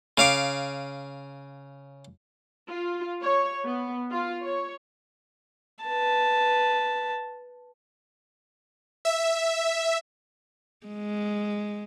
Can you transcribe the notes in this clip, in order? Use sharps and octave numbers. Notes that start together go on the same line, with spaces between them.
C#3 F5 D6
F4
C#5
B3
F4
C#5
B4 A5
E5
G#3